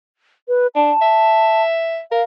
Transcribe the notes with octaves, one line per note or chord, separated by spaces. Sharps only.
B4
D4 A5
E5
A#4 F5